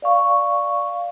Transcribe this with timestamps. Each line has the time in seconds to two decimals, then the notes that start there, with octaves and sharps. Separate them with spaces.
0.02 D5 F5 C#6